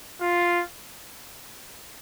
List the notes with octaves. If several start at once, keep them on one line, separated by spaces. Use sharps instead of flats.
F4